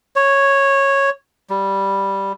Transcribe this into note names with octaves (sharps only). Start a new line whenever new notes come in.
C#5
G3